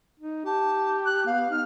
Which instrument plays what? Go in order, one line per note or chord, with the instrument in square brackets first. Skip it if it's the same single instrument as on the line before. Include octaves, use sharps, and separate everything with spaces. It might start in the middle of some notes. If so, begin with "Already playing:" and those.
[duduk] D#4
[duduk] G4 [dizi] A5
[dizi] F#6
[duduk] B3 [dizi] F5
[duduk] D#4 [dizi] F6